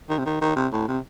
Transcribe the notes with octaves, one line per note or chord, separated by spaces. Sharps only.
D#3
C3
D#3
D#3
C3
A2
C3